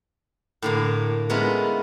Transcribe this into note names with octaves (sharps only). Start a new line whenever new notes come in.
A2 D3 A#3
G#3 B3 C#4 E4 F4 A#4